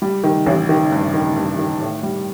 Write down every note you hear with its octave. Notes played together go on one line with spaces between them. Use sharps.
G3
D#3
A1
D#3
G2
D#3
G2
D#3
A2
G3